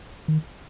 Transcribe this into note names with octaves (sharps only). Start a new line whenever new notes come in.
D#3